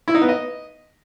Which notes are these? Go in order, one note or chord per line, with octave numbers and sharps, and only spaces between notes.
E4
D#4
B3
D#5